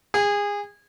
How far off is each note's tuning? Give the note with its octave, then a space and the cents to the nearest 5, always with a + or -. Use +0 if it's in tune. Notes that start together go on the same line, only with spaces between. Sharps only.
G#4 -25